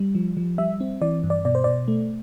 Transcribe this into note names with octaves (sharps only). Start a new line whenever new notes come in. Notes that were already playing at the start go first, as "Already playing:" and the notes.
Already playing: G3
F3
F3
G3 E5
C4
E3 D5
G2
D5
B2 D5
C5
B2 D5
A3